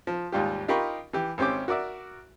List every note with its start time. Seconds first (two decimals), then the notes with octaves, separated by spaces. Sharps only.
0.07 F3
0.32 D#2 G#2 G3 F4 G4
0.68 D#4 F4 G4 A#4 B5 C#6
1.13 E3 G4
1.38 G#1 C4 C#4 G4 G5 D6
1.68 F#4 A#4 D5 E5